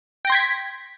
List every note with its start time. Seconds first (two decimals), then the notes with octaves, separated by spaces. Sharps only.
0.25 G5
0.27 A#6
0.30 C6
0.32 G#6
0.35 B6